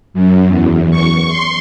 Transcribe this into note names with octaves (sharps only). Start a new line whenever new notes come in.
F#2
E2
C#6
C6